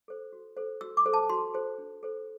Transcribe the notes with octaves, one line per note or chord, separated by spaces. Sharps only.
A4 C5
F#4
A4 C5
F#4 E6
D6
A4 C5
A5
F#4 C6
A4 C5
D4
A4 C5